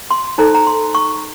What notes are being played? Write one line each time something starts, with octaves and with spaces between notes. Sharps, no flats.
C6
D#4 A4 C5 A#5
A#5
C6
C#6